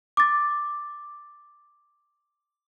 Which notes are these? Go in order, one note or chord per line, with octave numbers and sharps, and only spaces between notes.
D6 A6